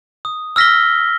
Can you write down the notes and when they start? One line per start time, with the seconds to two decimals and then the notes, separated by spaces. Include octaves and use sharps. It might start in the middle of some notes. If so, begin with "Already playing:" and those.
0.25 D#6
0.56 E6 F6 A#6 B6 G7